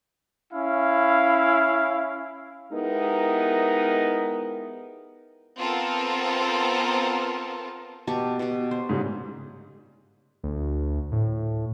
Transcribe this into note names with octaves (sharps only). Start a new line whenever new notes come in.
C#4 E4 F5
G#3 B3 D#4 E4 G4 A#4
B3 C4 F4 A4 A#4
B2 G4 A5 C#6
B2 G4
C5
G#2 C#3 G3
D2
A2